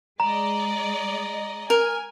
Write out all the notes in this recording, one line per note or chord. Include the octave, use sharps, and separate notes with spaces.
G#3 D5 D#5 A#5
A#4 G#5